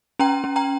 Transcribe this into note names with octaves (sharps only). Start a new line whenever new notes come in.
C#4 G5 A#5
C#4
G5 A#5